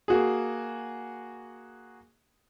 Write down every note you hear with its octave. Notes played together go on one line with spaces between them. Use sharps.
A#3 F#4 G#4